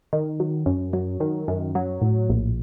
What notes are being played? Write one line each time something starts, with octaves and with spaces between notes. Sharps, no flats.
D#3
F#3
F#2
F#3
D#3
F#2
F#3
A2
A#1